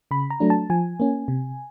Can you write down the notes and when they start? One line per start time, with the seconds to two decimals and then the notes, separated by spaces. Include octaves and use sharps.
0.11 C#3 B5
0.30 A#5
0.40 F#3 A3 D4
0.50 A5
0.70 F3 G#5
1.00 A#3 C#4
1.28 C3